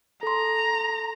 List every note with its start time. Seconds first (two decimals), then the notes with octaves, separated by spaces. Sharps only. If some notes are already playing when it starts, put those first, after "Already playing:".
0.23 A4 A#5 C6